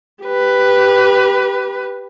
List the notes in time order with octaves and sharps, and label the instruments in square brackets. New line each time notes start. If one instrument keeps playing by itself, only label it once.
[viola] G4 B4